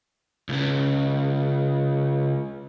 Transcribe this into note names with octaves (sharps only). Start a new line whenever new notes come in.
C#2 C#3